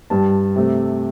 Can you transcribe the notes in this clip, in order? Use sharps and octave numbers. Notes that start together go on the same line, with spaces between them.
G2 G3 A5
C3 A3